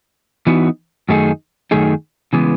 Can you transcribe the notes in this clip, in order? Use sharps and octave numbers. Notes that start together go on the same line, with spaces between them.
E3 B3 D#4 F#4
F#2 D#3 A3 D#4 G#4
F#2 D#3 A3 D#4 G#4
C#3 E3 G#3 B3